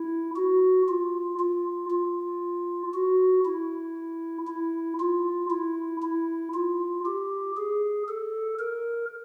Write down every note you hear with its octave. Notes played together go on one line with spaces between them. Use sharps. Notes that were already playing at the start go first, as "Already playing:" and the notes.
Already playing: E4
F#4
F4
F4
F4
F#4
E4
E4
F4
E4
E4
F4
G4
G#4
A4
A#4